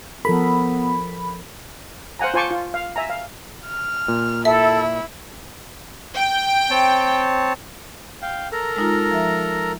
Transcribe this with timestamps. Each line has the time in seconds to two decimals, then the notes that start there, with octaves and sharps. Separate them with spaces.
0.25 F3 B3 A4 A#4 B5
2.19 C5 F5 F#5 G#5 A#5
2.34 F4 C5 G#5 A5 C#6 D6
2.51 F4
2.74 F5
2.96 E5 G#5 A#5
3.09 F5
3.67 F6
4.08 A#2
4.45 E4 A4 E5
6.16 G5
6.70 C4 C#5 A5
8.22 F5 G5
8.52 A4 A#4 A#5
8.76 G#3 D#4 F4
9.11 F3 E5